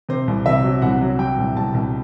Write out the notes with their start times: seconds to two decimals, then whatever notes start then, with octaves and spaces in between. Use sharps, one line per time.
0.09 C3 C5
0.28 C2
0.46 C3 E5
0.64 F#3
0.82 C2 F#5
1.01 F#3
1.19 F#3 G5
1.38 C2
1.56 C2 A5
1.74 C2